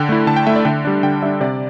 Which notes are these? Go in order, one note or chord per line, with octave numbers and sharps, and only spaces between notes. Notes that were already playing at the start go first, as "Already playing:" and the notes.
Already playing: D3 G5
A3 E4
D3 A5
G5
A3 E4 E5
D5
D3 G5
G3 D4
D3 G5
G3 D4 E5
C3 D5